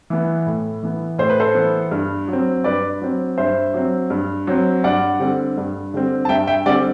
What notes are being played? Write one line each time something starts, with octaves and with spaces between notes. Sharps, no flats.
E3 B3
A2
E3 B3
A2 C5
B4
A4 C5
E3 B3
G2
F#3
C4
G2 B4 D5
F#3 C4
G2 C5 E5
F#3 C4
G2
F#3 C4
G2 D5 F#5
D3 G3 C4
G2
D3 G3 C4
A5
G2 E5 G5
E5 G5
D3 G3 C4 D5 F#5